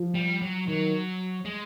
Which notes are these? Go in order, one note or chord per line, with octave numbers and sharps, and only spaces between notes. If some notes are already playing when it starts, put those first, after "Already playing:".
Already playing: F3
G3
F#3
D#3 F#3
G#3